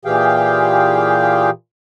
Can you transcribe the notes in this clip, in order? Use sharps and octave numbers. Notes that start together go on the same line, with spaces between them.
A#2 E3 G4 G#4 F5 G5